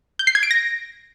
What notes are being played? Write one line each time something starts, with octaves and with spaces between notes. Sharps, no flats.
G6
C7
G#6
D7
A#6